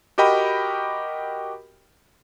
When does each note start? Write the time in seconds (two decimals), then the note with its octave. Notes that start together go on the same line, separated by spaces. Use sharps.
0.18 F#4 G4 A#4 D#5 G5 B5